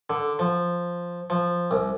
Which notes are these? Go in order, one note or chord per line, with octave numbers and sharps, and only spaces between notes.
D3
F3
F3
C2